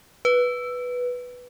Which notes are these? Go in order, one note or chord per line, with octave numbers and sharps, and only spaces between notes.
B4